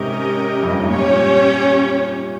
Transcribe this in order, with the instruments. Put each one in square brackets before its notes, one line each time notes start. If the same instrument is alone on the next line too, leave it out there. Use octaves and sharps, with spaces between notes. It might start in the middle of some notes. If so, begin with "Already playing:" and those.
Already playing: [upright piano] G#2 C3 [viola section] C#4 G4 A#4 D#5
[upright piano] F2
G2
G#2
[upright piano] G2 A#2 [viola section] C#4 G4 C#5